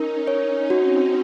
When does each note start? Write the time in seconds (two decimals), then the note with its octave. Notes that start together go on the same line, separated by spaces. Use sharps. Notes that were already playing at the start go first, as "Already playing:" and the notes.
Already playing: C#4 D#4 A#4
0.27 C#4 C#5
0.69 C4 F#4